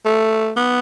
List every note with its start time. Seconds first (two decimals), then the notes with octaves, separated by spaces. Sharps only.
0.05 A3
0.57 B3